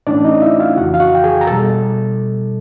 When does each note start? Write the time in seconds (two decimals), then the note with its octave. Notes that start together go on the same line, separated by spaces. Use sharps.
0.07 A2 E3 A3 C#4 D4 D5
0.24 D#4 D#5
0.42 E4 E5
0.59 F4 F5
0.77 F2 C#3 E3 F#4 F#5
0.94 F5
1.00 F#4 F#5
1.15 G5
1.24 G#4 G#5
1.41 A#5
1.47 B2 G3 A4 A5